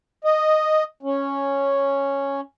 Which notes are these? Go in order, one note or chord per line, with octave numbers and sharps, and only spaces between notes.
D#5
C#4